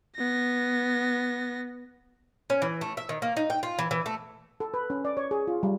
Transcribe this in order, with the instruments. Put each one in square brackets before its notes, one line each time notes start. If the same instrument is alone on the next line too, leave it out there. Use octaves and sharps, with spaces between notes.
[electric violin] B3 A#6
[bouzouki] C#4
E3
A3
E5
D#3
A#3
D#4
G5
F4
E3
E3
A3
[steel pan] A4
B4
C#4
D5
C#5
G#4
F4
G3